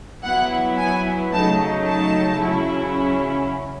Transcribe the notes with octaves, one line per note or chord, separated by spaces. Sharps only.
F#3 B3 E4 F#5
G#5
C#3 F#3 A3 D#4 A5
A5
C#3 F#3 C#4 E4